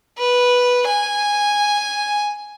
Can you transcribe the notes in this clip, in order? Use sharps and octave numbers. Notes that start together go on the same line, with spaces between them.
B4
G#5